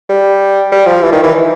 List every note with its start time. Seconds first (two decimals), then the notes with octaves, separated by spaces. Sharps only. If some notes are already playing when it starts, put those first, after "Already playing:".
0.09 G3
0.72 G3
0.86 F3
1.02 E3
1.12 D#3
1.23 E3